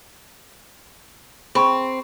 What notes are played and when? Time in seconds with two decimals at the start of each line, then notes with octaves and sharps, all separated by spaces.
1.55 C4 G#4 B5 C#6